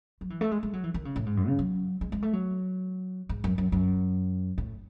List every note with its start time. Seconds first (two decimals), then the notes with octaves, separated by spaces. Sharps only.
0.21 F#3
0.30 E3
0.41 A3
0.51 G#3
0.63 G#3
0.73 F#3
0.84 E3
0.94 D#3
1.05 C#3
1.16 A2
1.26 G#2
1.37 F#2
1.48 C#3
1.59 F#3
2.01 G#3
2.12 G#3
2.22 A3
2.33 F#3
3.29 G#2
3.44 F#2
3.58 F#2
3.72 F#2
4.58 A2